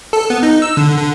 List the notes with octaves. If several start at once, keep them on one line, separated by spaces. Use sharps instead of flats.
A4
B3
D#4
E6
D3
D3